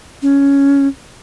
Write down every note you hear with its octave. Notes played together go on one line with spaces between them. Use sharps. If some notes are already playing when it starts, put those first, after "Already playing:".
C#4